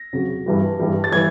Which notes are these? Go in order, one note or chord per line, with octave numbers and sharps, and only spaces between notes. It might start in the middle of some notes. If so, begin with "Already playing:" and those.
Already playing: A#6
F2 C#3 F#3
G2 E3 G3
G2 E3 G3
A6
E3 G3 G#6